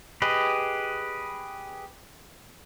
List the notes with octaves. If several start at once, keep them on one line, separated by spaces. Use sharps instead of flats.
G4 G#4 B4 D#5